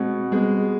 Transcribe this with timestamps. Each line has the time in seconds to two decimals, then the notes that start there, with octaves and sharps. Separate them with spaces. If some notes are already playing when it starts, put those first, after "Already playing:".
Already playing: B2 G#3 C4
0.32 G3 G#3 B3